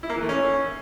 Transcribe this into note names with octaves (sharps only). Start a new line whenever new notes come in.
E4
A#3
E3
A3
C#4